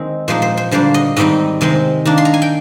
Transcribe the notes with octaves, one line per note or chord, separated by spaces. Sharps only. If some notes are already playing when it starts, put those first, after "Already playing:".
Already playing: D#3 G#3 C4
A#2 F3 G#3 D#4 C5
C5
C5
D3 G3 A#3 D4 C5
D#5
G#2 D#3 G3 C4 D#4 D#5
C3 D#3 G#3 C4
D#3 A#3 D4
C6
A#5
G#5
G5